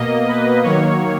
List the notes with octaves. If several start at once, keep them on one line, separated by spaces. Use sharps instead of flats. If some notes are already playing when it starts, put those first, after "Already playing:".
Already playing: B2 A#3 D#5
B4
D#3 F#3 A#3 C#5